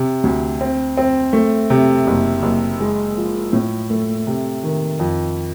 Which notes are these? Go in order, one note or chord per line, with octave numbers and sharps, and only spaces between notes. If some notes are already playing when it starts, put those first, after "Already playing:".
Already playing: C3
D2
C4
C4
A3
C3
F#1
F#1
G#3
F3
A2
A3
C3
D#3
F2